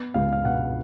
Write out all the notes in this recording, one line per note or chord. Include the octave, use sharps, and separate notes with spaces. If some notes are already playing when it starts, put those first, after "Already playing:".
Already playing: B3
C#2 F5
F5
B2 F#5